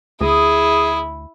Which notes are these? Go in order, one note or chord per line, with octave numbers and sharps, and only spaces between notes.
D2 E4 G#4 D#6